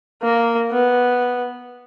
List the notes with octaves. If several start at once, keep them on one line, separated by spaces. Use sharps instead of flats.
A#3
B3